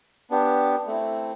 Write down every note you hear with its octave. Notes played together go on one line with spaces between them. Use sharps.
B3 D4 G4
A3 C4 E4